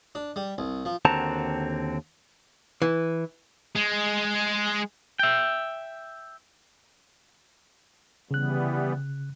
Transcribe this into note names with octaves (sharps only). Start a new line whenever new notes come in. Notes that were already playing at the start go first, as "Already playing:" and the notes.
D4
G3
C2
F3
D#2 D3 C4 F#4 A5 A#5
E3
G#3
E5 G5
C#3 E3 G3 B3 F#6